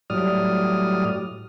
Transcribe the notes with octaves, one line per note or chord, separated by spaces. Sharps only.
A2 F#3 G3 D5 D#6 F6